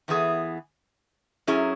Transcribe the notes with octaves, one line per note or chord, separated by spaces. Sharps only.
E2 E3 B3 E4 G#4
F#2 F#3 C#4 E4 G#4